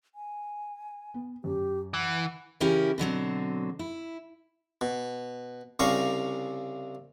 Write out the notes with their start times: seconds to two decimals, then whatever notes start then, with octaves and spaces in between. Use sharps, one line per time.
0.15 G#5
1.14 B3
1.44 F#2 G4
1.94 E3 F#5
2.60 C#3 E3 C#4 E4 G4 A#4
2.98 B2 D3 F#3 C4
3.79 E4
4.81 B2
5.79 C2 C#3 G3 F5 A#5 C#6